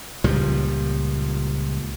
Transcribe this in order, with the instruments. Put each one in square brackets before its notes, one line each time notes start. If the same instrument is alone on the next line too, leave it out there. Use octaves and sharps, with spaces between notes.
[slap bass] C#2 A#2 F3 G3